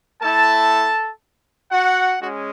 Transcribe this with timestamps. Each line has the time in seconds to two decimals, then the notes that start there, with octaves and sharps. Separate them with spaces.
0.21 A3 E4 A4 A5
1.72 F#4 F#5
2.21 G#3 C#4 F#4